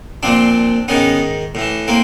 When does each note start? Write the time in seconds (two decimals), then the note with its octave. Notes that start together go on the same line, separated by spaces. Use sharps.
0.23 A#2 F3 C4 D4
0.88 G#2 D#3 B3 C#4
1.55 A2 E3
1.88 A#3 C4